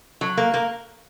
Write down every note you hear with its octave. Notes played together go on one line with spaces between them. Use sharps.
F#3
A#3
A#3